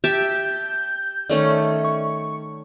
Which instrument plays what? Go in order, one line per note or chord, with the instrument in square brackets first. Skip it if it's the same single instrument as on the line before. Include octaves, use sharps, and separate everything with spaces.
[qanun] G4 E5 A5 [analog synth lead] G6
[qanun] D#3 A3 C#4 [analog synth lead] D5
[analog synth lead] C#6